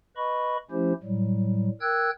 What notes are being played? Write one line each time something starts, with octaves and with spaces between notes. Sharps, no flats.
B4 D#5 B5 C#6
F3 A3 C#4 E4 G4 C5
A2 F#3 G3
A#4 G5 E6 F#6 G#6